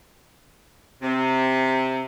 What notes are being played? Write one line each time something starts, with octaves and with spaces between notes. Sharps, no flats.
C3